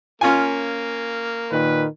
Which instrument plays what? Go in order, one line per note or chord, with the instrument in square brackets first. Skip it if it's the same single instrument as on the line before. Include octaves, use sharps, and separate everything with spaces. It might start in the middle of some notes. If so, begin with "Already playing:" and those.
[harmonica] A#3 [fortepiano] C#4 F4 G#5
[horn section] A#2 D#3 B4